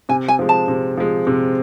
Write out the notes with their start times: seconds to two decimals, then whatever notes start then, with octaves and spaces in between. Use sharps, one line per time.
0.09 C3 G#5
0.28 G#5
0.39 F3 G#3
0.49 A5
0.68 C3
0.97 F3 G#3
1.27 C3